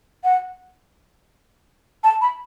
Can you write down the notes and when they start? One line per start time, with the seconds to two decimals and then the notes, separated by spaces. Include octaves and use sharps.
0.24 F#5
2.03 A5
2.21 B5